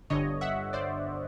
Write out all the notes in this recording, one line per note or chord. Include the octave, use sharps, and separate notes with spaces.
G1 G2 D3 C#5 D#5
E5 F#5
C5 D5